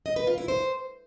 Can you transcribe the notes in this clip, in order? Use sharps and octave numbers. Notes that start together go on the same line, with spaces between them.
D#5
B4
F4
E4
C5